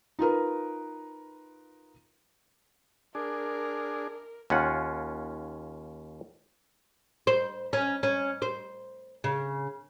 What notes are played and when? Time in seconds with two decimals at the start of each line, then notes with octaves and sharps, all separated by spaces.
0.19 D#4 F4 A#4 B4
3.15 D4 G#4 A#4
4.50 D#2 C#4 F4 F#5
7.27 C5
7.73 C#4
8.03 C#4
8.42 C5
9.24 C#3